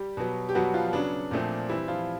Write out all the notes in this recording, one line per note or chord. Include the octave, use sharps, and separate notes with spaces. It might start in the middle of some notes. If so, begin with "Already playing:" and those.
Already playing: G3 G4
B2 F#3 B3
G4
B2 F#3 G3 B3 F#4
F3 F4
C#3 F#3 B3 D4
A#2 F3 A3 C4
E3 G3 C4 E4
F3 F4